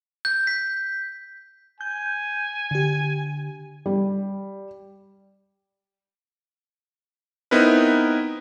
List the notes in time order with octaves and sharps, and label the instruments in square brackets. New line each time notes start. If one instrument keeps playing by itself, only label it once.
[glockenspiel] G6
B6
[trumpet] G#5 [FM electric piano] G6
[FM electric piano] D3 G4
[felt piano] G3
[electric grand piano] B3 C4 D#4 E4 A#4 B4